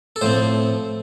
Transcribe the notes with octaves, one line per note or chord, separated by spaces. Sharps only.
A4
A2 F3 C4 C5